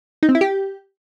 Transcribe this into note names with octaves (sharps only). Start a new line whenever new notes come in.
D#4
C4
E4
G4